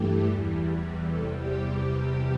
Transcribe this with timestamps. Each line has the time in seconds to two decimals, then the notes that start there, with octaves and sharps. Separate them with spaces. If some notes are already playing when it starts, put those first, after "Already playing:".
Already playing: G2 E3 A3 G4
0.24 E2 E3 G3
1.09 E2 C3 G3 A4
1.37 G4